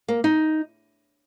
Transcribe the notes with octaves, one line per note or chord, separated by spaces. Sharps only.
A#3
D#4